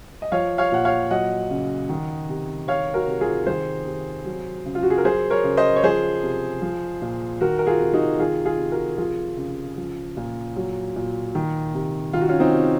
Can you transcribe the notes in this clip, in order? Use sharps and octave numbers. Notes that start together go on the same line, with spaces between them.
D#5
F3 C#5 F5
C#5 F5
A#2 F#5
C#5 F5
F#3 D#5 F#5
C#3
D#3
C3
D#3 C#5 F5
F#4 A#4
C3
F4 G#4
D#3 G#4 C5
C3
F#3
C#3
F4
F#4
G#4
A#4
F#3 G#4 C5
A#4 C#5
C#3
C5 D#5
C#5
F3 G#4 C5
C3
F3
A#2
D#3 F#4 A#4
A#4
F4 G#4
C3
D#4 F#4
D#3 F4 G#4
F4 G#4
C3
F#4 A#4
F3 F4 G#4
C#3
F3
A#2
F#3
A#2
D#3
C3
D#3 F4
F#4
C#4 F4
C4 D#4
C3